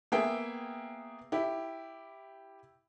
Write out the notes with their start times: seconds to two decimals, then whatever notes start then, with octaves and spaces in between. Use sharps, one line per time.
0.12 A#3 B3 G#4 E5 G5
1.32 E4 G4